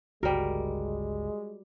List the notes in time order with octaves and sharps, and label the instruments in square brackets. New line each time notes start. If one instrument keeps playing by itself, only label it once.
[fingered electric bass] G1 C#2 [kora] G3 A#4 [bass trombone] G#3 [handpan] F#4